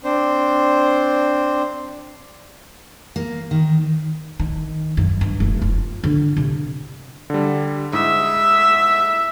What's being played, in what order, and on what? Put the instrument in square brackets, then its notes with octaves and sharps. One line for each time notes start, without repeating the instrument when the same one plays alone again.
[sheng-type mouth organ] C4 D4 C5
[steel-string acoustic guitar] A#3
D#3
[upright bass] D#3
F#2
G2
F1
F4
D3
C3
[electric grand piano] D3 G3
[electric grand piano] G#2 E4 D#6 [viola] E5